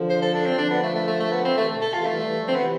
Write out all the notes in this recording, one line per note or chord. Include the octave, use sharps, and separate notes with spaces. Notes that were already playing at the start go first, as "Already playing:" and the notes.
Already playing: D3 F3
C5
A4
D4
C4
G3
D3 F3 D4
B3
A3
A3
A3
A3
B3
C4
C3 E3 A3
B2 D3
A4
C3 E3 F4
E3 G3 A3
E3 G3
D3 F3
C4
C3 E3 B3